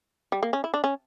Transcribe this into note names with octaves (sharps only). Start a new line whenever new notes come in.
G3
A#3
C#4
E4
D4
C#4